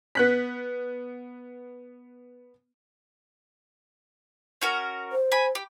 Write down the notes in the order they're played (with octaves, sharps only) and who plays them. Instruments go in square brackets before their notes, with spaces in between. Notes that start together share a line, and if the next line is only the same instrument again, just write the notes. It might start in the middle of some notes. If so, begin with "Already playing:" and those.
[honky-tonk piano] B3 F#6 B6
[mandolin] C#4 F#4 A#4
[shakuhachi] C5
[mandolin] G#5 B5
G4